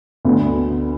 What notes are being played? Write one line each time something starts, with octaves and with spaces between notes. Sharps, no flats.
D2 D3 B3